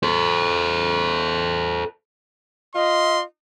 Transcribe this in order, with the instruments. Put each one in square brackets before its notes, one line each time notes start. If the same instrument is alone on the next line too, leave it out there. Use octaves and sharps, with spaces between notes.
[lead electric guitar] A4 C5
[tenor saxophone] F4 [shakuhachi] D#5 [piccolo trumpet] C6